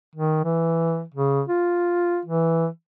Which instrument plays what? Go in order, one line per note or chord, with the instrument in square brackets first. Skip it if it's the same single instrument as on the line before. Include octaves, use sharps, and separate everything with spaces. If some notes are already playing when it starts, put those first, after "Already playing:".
[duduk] D#3
E3
C#3
F4
E3